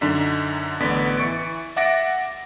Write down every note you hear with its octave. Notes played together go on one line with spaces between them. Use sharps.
F#2 D3 D4 D#4 B6
A1 D3 B3 D5 B6
E3 C#6 A6 D7
E5 F#5 D6 A6 A#6 D7